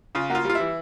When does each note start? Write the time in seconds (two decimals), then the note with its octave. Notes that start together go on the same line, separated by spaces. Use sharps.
0.15 C#3 F4
0.30 A#3 F#4
0.35 F4
0.44 G3
0.50 F4
0.55 E3 E4